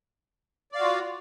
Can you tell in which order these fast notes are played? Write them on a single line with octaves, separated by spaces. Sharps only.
D5 F5 F#4 F4